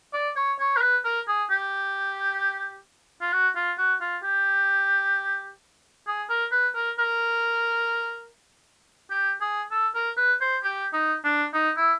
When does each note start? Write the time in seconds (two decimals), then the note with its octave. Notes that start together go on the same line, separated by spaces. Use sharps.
0.13 D5
0.36 C#5
0.60 C#5
0.77 A#4
0.81 B4
1.05 A#4
1.28 G#4
1.51 G4
3.21 F4
3.33 F#4
3.56 F4
3.78 F#4
4.01 F4
4.24 G4
6.07 G#4
6.30 A#4
6.52 B4
6.75 A#4
6.99 A#4
9.11 G4
9.41 G#4
9.71 A4
9.95 A#4
10.17 B4
10.41 C5
10.64 G4
10.93 D#4
11.25 D4
11.54 D#4
11.77 E4